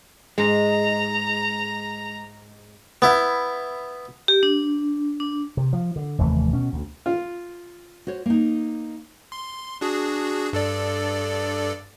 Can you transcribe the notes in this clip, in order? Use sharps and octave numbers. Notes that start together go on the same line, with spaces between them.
G#2 G#3 A#5
B3 E4
G4
D4
D4
C3
F3
D3
F1 D#2 E3 A3
B2 C#4
D2
F4
F#4 C5 C#5
A#3 D#4
C6
D4 F#4 G#4
G2 A4 D5